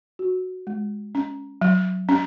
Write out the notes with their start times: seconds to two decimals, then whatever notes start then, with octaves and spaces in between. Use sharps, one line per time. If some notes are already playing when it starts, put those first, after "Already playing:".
0.19 F#4
0.67 G#3
1.15 C#4
1.61 F#3
2.09 C#4